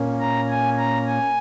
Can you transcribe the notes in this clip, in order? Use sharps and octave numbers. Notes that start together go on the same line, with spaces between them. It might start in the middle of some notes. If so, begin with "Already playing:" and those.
Already playing: A#2 A#3 C#4
A#5
G#5
A#5
G#5